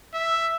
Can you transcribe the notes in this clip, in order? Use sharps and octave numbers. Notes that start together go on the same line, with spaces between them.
E5